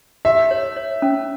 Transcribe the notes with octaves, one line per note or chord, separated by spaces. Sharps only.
G4 E5
C#5
C#5
C#4